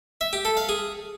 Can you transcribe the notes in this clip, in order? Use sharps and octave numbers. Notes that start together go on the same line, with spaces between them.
E5
G4
A4
F5
G#4